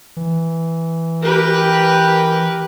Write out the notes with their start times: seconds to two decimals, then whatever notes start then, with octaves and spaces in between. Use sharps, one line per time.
0.17 E3
1.23 G4 A#4 B4